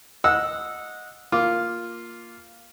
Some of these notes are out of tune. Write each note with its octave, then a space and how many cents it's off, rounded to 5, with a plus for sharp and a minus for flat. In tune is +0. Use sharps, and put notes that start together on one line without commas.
D#5 +0 F#5 -20 E6 +0
A#3 +0 F4 +0 D6 -10